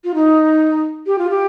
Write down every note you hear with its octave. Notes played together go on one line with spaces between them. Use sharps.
F4
D#4
G4
F4
G4